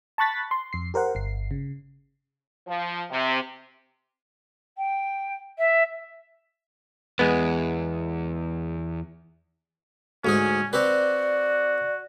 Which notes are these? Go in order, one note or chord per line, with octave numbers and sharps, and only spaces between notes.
A5 B5 C#6 F#6 A6 B6
C6
F2 C7
G4 A#4 C5 F#5
G1 C7
C#3
F3
C3
G5
E5
E2 G#3 B3
D2 G#2 C#4 G#4
C4 F#4 G4 B4 D5